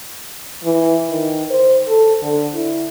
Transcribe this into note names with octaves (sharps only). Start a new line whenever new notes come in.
E3
D#3
C5
A4
D3
E4